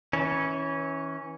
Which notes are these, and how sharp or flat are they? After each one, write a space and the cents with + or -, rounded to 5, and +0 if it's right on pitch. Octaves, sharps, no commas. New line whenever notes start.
E3 -30 C#4 -10